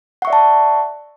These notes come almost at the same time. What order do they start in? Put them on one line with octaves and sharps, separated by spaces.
F#5 C#6 E5 D5 A5